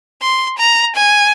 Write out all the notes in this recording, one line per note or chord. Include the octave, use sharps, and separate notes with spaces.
C6
A#5
G#5